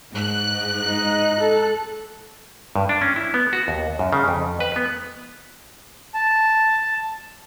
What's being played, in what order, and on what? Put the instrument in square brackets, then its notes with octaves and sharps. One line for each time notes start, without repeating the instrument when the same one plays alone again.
[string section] G#2 F#6
[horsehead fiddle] D#4
A4
[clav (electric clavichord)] G2
D4
C#4
E4
B3
F#4
D#2
F#2
C#3
F2
B4
B3
[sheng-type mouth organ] A5